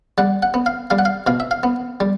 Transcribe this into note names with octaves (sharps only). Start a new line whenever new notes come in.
G3 F#5
F#5
B3
F5
G3 F5
F#5
F5
B2 F5
E5
F5
B3
G3